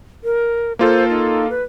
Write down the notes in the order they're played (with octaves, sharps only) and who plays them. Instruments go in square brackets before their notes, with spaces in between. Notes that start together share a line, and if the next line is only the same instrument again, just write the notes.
[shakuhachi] A#4
[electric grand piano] A#3 F4 A4 [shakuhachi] C5
[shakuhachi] D#4
B4